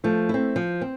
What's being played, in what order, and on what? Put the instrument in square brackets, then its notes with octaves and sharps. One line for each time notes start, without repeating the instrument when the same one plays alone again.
[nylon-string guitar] F3 [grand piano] A3
[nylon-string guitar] C4 E4
F3
C4